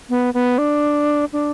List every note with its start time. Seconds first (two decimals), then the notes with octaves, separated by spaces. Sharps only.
0.09 B3
0.34 B3
0.58 D4
1.33 D4